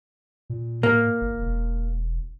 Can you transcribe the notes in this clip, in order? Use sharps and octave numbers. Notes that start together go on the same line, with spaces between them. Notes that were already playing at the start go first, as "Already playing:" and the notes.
A#2
A2 A#3
G1
E1